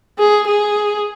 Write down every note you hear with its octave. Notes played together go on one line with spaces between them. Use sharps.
G#4
G#4